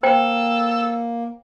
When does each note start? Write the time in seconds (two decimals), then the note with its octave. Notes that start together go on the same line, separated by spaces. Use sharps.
0.03 A#3 A4 C5 G5